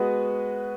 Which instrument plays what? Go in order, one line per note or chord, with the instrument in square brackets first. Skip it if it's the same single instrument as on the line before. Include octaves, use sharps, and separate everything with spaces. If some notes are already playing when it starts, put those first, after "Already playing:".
Already playing: [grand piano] G#3 B3 F#4 B4 D#5